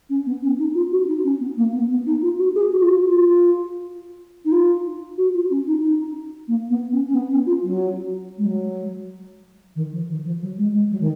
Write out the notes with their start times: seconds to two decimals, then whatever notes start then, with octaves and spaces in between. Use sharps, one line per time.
0.09 C#4
0.26 B3
0.42 C#4
0.58 D#4
0.74 F4
0.91 F#4
1.07 D#4
1.24 C#4
1.40 B3
1.57 A#3
1.73 B3
1.89 B3
2.06 D#4
2.22 F4
2.39 F#4
2.55 G#4
2.71 F#4
2.80 F4
2.88 F#4
3.04 F4
4.45 D#4
4.52 F4
5.17 F#4
5.33 F4
5.50 C#4
5.67 D#4
5.82 D#4
6.48 A#3
6.69 B3
6.92 C#4
7.07 C#4
7.14 B3
7.30 C#4
7.46 F4
7.63 F#3
8.38 G#3
8.45 F#3
9.75 D#3
9.92 F3
10.09 D#3
10.25 F3
10.42 F#3
10.58 G#3
10.74 G#3
10.91 F#3
11.00 D#3